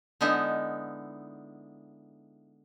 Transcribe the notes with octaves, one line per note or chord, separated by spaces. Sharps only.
D3 G#3 B3 D#4 E4